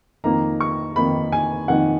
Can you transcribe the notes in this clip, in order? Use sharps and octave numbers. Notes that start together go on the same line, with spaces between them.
F2 D#3 A#3 D#4 A#5
C#6
F2 D#3 A#3 D#4 B5
G#5
F2 D#3 A#3 D#4 F#5